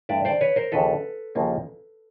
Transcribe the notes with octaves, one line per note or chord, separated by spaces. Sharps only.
G2 E3 A3 D4 D5 E5
C5 D5
B4 C#5
A#4 C5
D#2 C#3 F3 A#3 A4 B4
D#2 C#3 F3 A#3